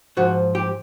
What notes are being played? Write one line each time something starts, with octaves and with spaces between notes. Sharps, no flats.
G#2 F3 F#4
G4